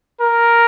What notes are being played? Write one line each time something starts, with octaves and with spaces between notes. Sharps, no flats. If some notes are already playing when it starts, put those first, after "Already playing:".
A#4